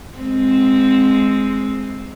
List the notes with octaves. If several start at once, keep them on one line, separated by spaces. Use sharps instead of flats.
G#3 C4